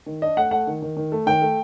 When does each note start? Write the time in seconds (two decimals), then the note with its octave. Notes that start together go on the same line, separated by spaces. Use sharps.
0.06 D#3
0.22 D4 D#5
0.37 A3 F#5
0.51 A3 F#5
0.67 D#3
0.82 D#3
0.97 D#3
1.12 A3
1.26 D#3 G5
1.42 A3